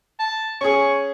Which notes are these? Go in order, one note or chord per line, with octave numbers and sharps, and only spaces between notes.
A5
C#4 G#4 C#6